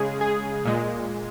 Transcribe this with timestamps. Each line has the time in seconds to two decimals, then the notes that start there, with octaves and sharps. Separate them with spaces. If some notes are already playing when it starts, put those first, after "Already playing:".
Already playing: C#3 G#3 G#4
0.21 G#4
0.65 A#2 G#3